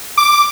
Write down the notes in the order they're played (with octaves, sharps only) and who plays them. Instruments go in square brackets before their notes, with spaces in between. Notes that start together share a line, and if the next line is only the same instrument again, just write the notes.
[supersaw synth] D6